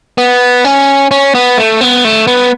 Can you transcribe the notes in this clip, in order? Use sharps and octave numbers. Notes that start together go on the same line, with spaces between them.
B3
C#4
C#4
B3
A3
B3
A3
B3